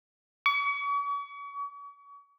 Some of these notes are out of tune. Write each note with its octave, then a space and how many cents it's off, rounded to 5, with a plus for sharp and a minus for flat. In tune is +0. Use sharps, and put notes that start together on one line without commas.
C#6 +40